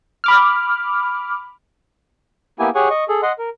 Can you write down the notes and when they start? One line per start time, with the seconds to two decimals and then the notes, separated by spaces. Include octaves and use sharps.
0.24 B5 D6 F6
2.59 A#3 B3 E4 G4 G#5
2.75 G4 G#4 C#5 F#5 G#5 C#6
2.90 D#5 C#6
3.08 G#4 A4
3.23 D#5 F#5 C6
3.38 A#4